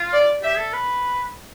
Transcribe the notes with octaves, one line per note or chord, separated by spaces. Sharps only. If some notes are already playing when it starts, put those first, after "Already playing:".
Already playing: F4
D5
G4 E5
A4
B4